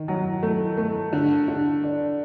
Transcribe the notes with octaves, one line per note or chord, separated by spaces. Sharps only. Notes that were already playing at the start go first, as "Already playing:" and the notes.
Already playing: D#3
F#3
A3
A3
D3
D3
D4